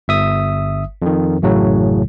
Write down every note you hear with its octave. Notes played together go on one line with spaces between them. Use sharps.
G1 E5 D#6
F2 D#3
A1 F#2 A2 C#3 F#3